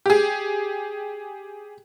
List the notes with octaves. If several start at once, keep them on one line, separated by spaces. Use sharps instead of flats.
G4 G#4